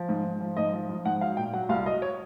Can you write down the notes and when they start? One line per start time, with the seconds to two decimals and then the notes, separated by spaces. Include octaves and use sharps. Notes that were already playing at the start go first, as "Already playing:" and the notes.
Already playing: F3
0.09 G#2
0.25 G#2
0.41 F3
0.57 G#2 D#5
0.73 F3
0.89 F3
1.05 G#2 F#5
1.21 F#3 F5
1.37 A#2 G5
1.53 F#3 F#5
1.69 C2 F5
1.86 F#3 D#5
2.02 C#5